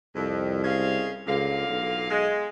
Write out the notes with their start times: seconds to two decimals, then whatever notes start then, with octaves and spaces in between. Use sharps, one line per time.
0.15 C2 F2
0.64 C#3 G#3 F5
1.27 C#2 A#2 D3 F5
1.69 B1
2.10 G#3